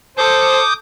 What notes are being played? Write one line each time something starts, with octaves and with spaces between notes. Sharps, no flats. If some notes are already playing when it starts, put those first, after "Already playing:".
A4 C5 D6 D#6 G6